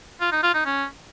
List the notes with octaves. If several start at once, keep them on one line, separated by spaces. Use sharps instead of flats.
F4
D#4
F4
D#4
C#4